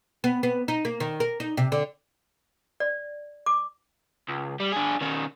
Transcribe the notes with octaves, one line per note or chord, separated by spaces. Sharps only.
B3
B3
D#4
A#3
D#3
A#4
D#4
C3
D3
D5
D6
C#2
G3
D4 G#4
D#3 C#4